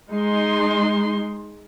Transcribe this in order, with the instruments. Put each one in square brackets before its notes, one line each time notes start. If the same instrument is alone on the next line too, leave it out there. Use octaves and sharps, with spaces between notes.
[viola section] G#3 D#4 C6